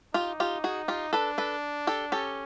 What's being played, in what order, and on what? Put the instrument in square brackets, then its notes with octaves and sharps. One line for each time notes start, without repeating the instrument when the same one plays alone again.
[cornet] D#4 [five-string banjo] F4 G4
[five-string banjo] F4 G4
F#4 G#4
F4 G4
[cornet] D4 [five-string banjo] A4 B4
[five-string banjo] A4 B4
G4 A4
[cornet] C#4 [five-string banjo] G4 A4